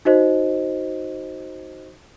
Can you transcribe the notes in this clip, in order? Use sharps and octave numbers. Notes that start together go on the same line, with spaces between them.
D#4 F#4 C5 D#5